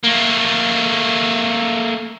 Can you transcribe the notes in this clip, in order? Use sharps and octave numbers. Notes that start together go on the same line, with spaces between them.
A3 A#3